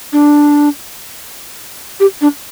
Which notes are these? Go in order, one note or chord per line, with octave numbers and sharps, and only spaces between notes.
D4
G4
D4